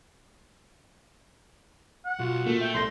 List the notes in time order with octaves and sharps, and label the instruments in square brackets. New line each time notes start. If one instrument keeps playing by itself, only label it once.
[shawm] F#5
[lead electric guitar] B1 [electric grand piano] F4 F#4
[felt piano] A#2 [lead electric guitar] A3
[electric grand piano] E5 [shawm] G5
[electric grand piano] C2 A4 A#6 [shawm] C6